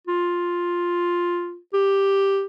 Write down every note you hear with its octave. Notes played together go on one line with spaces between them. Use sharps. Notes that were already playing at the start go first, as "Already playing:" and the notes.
F4
G4